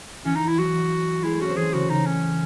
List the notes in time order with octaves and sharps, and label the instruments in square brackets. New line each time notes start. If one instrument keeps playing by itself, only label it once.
[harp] E3 [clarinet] C#4
[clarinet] D#4
E4
[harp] F#3 [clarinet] F#4
[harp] G#3 [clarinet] E4
[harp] A3
[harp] C#4 [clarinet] F#4
[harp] C4
[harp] E3 [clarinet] G#4
[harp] C#3 [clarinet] F#4
[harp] C#3 [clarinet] D#4
[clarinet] C#4